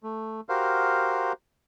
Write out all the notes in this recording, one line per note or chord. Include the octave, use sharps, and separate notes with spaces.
A3
F#4 G4 A#4 C5 F5